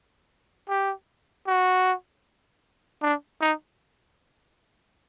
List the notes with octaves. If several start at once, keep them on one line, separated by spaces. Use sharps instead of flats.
G4
F#4
D4
D#4